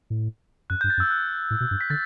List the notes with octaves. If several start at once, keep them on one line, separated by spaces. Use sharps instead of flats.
A2
F#2 F#6
G6
G2
A6
F#2
E6
F#6
A2
B2
G2
B6
D3 A6